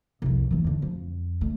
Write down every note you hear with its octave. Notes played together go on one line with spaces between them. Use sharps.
C2 F2
D#2 E3
E2 D3
F2
D3 A3